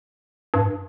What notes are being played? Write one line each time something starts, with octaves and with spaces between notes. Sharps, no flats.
G2